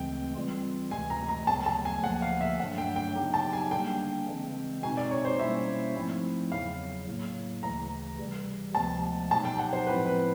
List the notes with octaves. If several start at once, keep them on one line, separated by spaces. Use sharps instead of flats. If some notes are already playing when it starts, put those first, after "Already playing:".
Already playing: D2 C#3 E3 G#3 C4 G5
E3 G3 C4 F4
D2 C3 E3 G#3 G#5
A#5
A#5
D2 C#3 F#3 B3 A5
A5
G#5
D2 D3 F3 A#3 F#5
F5
E5
G2 D3 F#3 A3 D4 F#5
G5
G5
C#3 F#3 B3 D#4 G4
A5
G#5
D3 G3 A#3 D4 G5
C#3 E3 G#3 C4
B2 G#3 C4 D#4 F#4 G#5
D5
C#5
C5
B2 G3 A#3 C#4 E4 E5
G#2 F3 A3 C4 E4
E2 C#3 F#3 F5
A2 F#3 A#3
D2 C#3 E3 A#5
C3 E3 G3
D2 C3 F3 G#3 B3 A5
B2 F#3 B3 D#4 G4 A5
G5
F#5
C5
A2 F3 G#3 C4 E4 B4
B4